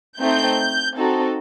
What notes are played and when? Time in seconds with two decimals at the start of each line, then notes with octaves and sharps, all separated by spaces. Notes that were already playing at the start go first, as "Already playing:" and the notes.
0.19 A3 C4 D#4 G6
0.96 C4 D#4 F#4 A4